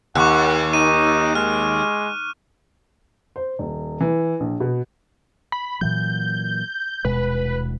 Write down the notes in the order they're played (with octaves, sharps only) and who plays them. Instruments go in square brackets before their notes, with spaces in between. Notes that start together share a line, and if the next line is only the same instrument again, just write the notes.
[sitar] D#2 [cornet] F#5 [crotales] C#6 D6 F#6
[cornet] D#4 [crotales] D#7
[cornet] G#3 [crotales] F6
[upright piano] C5
D#1
E3
A#1
B2
[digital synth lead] B5
[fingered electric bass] A#2 E3 F#3 [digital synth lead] G6
[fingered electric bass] D#1 B2 G#3 [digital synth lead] B4